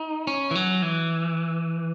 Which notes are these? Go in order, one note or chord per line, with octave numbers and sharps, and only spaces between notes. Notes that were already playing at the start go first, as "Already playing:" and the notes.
Already playing: D#4
C#4
E3
F#3
E3